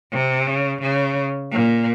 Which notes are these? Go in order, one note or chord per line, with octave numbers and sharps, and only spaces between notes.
C3
C#3
C#3
A#2